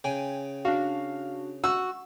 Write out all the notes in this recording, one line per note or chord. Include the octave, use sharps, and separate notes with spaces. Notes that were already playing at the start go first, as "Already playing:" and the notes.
C#3 G5 G#5
D4 F#4 F5
F#4 C#6 E6